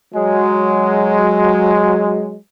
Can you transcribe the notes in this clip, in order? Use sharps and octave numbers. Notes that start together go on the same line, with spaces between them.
F#3 G#3